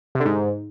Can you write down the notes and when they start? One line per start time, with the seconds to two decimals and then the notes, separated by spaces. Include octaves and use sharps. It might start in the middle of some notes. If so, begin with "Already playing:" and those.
0.15 C3
0.20 D3
0.25 G#2